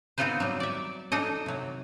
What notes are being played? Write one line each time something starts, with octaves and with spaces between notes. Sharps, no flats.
B3 C4 D#4 F4 B4 C5
F#3 G3
D5 E5
D4 D#4 A4 D#5
C3 F#3